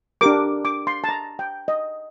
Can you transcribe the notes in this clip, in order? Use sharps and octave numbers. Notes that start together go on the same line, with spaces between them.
D4 G4 A#4 D6
D6
C6
A5
A#5
G5
D#5